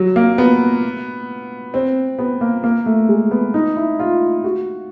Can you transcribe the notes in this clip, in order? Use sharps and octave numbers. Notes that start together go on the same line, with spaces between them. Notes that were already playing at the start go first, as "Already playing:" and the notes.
Already playing: F#3
A#3
B3
C4
B3
A#3
A#3
A3
G#3
B3
D#4
E4
F4
F#4